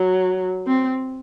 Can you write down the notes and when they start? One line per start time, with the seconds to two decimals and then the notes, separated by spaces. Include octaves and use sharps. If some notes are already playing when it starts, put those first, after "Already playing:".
Already playing: F#3
0.67 C4